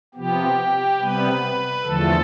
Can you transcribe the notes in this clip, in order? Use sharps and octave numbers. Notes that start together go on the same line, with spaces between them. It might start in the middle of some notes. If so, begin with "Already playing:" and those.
C3 F3 B3 G4
C3 G3 B3 B4
E2 D3 F3 A3 A4